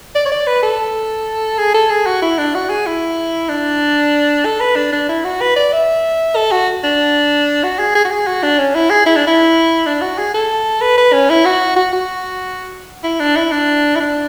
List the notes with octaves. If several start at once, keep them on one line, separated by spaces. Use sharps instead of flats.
D5
C#5
D5
B4
A4
G#4
A4
G#4
F#4
E4
D4
F#4
G#4
E4
D4
A4
B4
D4
D4
E4
F#4
B4
D5
E5
A4
F#4
D4
F#4
G#4
G#4
F#4
G#4
F#4
D4
C#4
E4
G#4
E4
D4
E4
D4
F#4
G#4
A4
B4
B4
C#4
E4
F#4
F#4
F#4
E4
D4
E4
D4
E4
D4